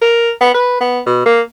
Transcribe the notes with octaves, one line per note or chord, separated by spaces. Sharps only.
A#4
B3
B4
B3
B2
A#3